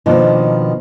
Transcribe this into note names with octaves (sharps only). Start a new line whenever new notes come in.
B2 D#3 F3 A#3 D4